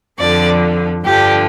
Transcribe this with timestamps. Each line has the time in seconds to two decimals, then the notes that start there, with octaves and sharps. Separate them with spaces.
0.18 F2 D3 F3 D5
1.04 G2 D3 F3 G4